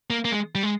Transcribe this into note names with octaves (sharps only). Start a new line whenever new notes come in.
A#3
A#3
G#3
G3
G#3